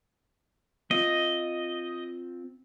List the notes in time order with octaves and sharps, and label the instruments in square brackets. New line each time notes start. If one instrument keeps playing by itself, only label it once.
[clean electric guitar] C4 F4 [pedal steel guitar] D#5